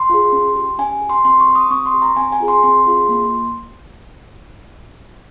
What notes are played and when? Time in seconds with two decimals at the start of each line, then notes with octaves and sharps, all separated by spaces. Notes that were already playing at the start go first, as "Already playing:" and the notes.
Already playing: C6
0.09 F4 G#4
0.32 C#4
0.56 G4
0.78 C#4 G#5
1.01 G4
1.09 C6
1.25 C4 C6
1.40 C#6
1.48 G4
1.55 D#6
1.71 C4 C#6
1.86 C6
1.94 G4
2.02 A#5
2.16 C4 G#5
2.32 G#5
2.40 F4 G#4
2.48 C6
2.63 C4 C6
2.86 F4 G#4
3.09 A#3